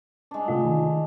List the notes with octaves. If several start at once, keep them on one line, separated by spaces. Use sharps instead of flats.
G#3 D4
C3 A3 F4
D#3